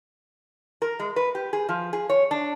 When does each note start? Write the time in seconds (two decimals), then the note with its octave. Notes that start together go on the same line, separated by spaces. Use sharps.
0.82 A#4
1.00 G#3
1.16 B4
1.35 G4
1.53 G#4
1.69 F3
1.93 G#4
2.10 C#5
2.31 D4